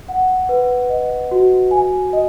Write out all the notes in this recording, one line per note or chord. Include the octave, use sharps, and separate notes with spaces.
F#5
B4
D#5
F#4
G#5
D#5